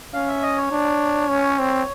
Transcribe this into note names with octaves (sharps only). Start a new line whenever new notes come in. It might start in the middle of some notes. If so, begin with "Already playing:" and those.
C#4 F5
E5
D#5
C#5
D4
C#4
C4